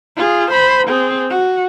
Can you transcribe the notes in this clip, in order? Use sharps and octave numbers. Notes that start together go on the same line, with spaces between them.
F4 G#4
C5 B5
C4 G#4
F#4